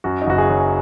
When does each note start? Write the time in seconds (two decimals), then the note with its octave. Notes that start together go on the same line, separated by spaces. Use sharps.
0.04 F#2 F#4
0.22 D#4
0.27 F#1 F#4
0.38 G#4
0.49 F#3